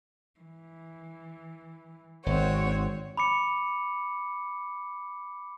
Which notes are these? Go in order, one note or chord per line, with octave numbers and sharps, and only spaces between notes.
E3
G#1 C4 F#4 C#5
B5 D6 C#7